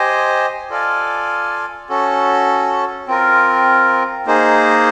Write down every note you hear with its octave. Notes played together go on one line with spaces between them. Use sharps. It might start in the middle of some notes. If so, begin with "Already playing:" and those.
Already playing: G4 C5 D#5 G#5
F4 A4 D5 F5 G#5
C#4 F#4 A4
C4 F4 A#4
A#3 D#4 G#4 C5